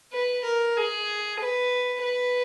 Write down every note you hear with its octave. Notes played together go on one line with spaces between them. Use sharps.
B4
A#4
G#4
B4
B4